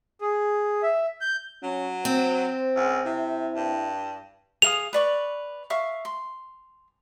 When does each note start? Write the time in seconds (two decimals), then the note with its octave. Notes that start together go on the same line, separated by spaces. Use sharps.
0.21 G#4
0.83 E5
1.21 G6
1.63 F#3 C#4
2.05 C4 C5
2.76 C#2
3.05 C3 E4
3.55 G2
4.62 G#4 F5 D#6 F7
4.93 B4 D5 C#6
5.70 E5 F5 C#6
6.05 C6